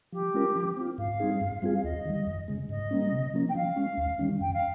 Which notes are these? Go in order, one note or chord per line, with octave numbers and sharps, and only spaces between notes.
F3 G4
G#3 C#4 F4 A#4
F3
C4 F4
G#2 F5
G3 C4 D#4 G#4
G2
G3 C4 F4 G#4
F5
D#2 D#5
D#3 G3
F2
C#3 G#3
G#2 D#5
G3 A#3 C#4
C3
F3 A#3 C#4
G5
F3 F5
G#3 C#4
D#2
D#3 G3 C#4
F2 G5
F5